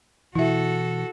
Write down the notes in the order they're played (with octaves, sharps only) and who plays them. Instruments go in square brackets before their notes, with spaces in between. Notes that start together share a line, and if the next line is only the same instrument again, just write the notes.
[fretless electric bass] B2 E3 [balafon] E4 E5 [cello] F#4 A4